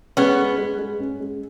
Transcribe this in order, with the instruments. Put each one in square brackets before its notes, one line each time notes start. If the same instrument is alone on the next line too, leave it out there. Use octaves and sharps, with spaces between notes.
[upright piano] G#3 [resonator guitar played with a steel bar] B3 C#4
[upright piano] G#3
G#3
G#3
C#4
G#3